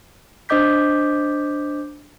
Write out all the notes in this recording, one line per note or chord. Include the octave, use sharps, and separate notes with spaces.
D4 C5 D#5 D6 G6 B6